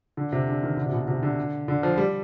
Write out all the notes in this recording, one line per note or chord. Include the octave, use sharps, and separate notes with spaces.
D3
C3
D3
D#3
D3
C3
B2
C3
D3
D3
F3
G3